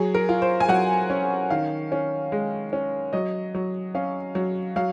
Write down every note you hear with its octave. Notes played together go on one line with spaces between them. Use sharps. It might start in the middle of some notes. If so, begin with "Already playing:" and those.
Already playing: F#3 G#4
A#4
F4
C5
G#5
F#3 F#5
C#4
D#3 F5
C#4
G#3
C#4
F#3 D#5
F#3
C#4 F5
F#3
F#3 F5